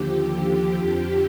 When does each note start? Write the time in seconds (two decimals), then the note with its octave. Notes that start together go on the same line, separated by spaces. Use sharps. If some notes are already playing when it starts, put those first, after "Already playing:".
Already playing: D#2 D3 F3 G4
0.78 F2 D3 F3